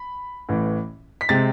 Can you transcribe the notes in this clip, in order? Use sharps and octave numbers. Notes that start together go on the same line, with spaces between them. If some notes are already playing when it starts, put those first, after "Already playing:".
Already playing: B5
A1 A2 E3
B6
C3 G#3 C4 A6